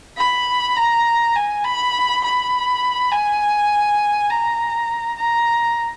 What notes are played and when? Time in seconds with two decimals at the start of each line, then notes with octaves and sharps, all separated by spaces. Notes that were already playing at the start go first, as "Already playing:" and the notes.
0.18 B5
0.77 A#5
1.36 G#5
1.65 B5
2.24 B5
3.12 G#5
4.31 A#5
5.18 A#5